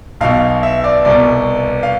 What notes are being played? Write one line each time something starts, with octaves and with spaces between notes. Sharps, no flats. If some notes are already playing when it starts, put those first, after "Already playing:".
B1 B2 F5
E5
D5
C2 B2 D5
F5